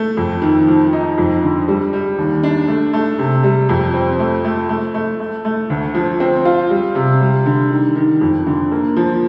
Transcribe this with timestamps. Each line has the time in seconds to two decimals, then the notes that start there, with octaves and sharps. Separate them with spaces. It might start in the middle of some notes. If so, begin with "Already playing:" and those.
Already playing: A3
0.17 F2
0.42 D#3
0.68 F3
0.93 D#4
1.18 F2
1.43 D3
1.68 G3
1.93 G3
2.18 D#2
2.43 D4
2.68 A3
2.93 A3
3.19 C3
3.44 G3
3.69 F2
3.94 C4
4.19 A3
4.45 A3
4.69 A3
4.95 A3
5.20 A3
5.45 A3
5.70 D2
5.95 F3
6.20 C4
6.45 F4
6.70 G3
6.95 C3
7.21 G3
7.46 D3
7.71 D#3
7.95 D#3
8.21 F2
8.47 D3
8.72 A#3
8.96 F3